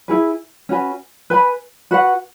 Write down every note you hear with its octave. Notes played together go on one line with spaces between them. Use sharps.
E4 G#4 B4
C#4 F#4 B4 G#5
B4 G#5 B5
F#4 B4 F#5